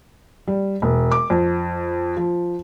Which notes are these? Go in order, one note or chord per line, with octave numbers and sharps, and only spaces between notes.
G3
E1
D6
F2
F3